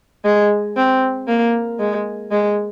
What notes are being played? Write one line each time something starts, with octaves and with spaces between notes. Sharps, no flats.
G#3
C4
A#3
G#3
G#3